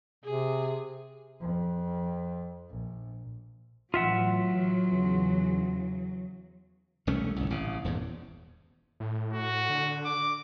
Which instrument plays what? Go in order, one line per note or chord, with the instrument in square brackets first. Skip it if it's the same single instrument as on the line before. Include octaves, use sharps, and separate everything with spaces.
[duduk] C3 [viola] G#4
[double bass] F2
A#1
[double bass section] A1 E3 [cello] F#3 [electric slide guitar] F4 E5 F#5
[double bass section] E2 C#3 E3
[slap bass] E1 C2 A3 C#4
G1 C2
A1 C#3
D#1 E2 G#2
[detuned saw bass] A2
[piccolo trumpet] F#4
[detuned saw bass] D3
[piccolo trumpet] D6